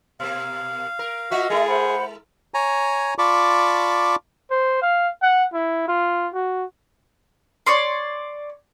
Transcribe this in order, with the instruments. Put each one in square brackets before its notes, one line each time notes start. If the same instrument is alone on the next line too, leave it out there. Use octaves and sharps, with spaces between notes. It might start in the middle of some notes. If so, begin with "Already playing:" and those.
[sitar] B2 A#3 [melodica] F5
[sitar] A#4
[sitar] A#3 F4 E5 [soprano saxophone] F#4 [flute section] D#5
[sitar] G#3 E4 A#4 [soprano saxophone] G#4
[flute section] C5 F#5 B5
[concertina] C#5 G#5 A#5
F4 D5 A5 B5 C#6 D6
[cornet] C5
F5
F#5
E4
F4
F#4
[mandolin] C#5 D5 C6